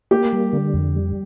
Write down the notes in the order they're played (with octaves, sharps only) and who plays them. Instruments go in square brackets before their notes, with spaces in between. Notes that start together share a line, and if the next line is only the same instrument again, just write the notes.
[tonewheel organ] A#3 [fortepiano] G4
[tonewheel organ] G3
D3
F2
G3